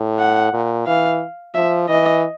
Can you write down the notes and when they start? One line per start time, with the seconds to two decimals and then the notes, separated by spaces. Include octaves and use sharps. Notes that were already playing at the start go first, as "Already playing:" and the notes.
Already playing: A2
0.19 F#5
0.53 A#2
0.87 E3 F5
1.55 F3 E5
1.89 E3 D#5